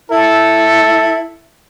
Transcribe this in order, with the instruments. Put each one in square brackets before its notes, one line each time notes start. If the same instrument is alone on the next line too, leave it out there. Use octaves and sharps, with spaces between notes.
[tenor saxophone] E4 [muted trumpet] A4